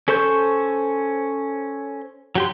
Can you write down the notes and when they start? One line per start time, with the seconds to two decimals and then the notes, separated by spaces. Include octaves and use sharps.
0.08 C#4 A4 C5 C#6 G6
2.35 F#3 G4 C6